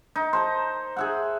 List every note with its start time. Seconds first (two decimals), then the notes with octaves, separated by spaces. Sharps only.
0.16 D#4
0.33 C5 A5 A#5
0.96 G#4 E5 F#5